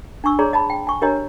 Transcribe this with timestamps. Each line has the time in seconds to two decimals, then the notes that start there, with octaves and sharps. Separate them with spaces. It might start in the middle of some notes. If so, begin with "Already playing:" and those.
0.24 D4 G#5 C#6 E6
0.39 G#4 C#5 D5 A#5 C6
0.53 D#5 A5 B5
0.70 G5
0.87 G#5 C#6
1.01 D4 G4 A#4 C#5 D#5 A#5